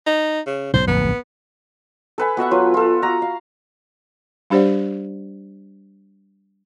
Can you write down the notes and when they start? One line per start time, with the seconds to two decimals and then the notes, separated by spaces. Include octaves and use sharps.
0.06 D#4
0.47 C#3
0.73 B1 G#2 C#3 C5
0.87 D1 A#1 F2 B3
2.18 A4 B4 G#5
2.37 B3 F#4 E5 F#5
2.51 F#3 F4 B4
2.74 F4 A4
3.02 F#4 A#5
3.22 F5
4.50 G3 D4 G4 C5 D5 F#5